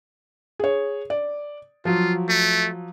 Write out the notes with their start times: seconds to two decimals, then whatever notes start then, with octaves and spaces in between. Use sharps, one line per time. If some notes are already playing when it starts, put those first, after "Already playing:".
0.59 G#4 C#5
1.10 D5
1.85 F3 F#3 F4
2.29 A3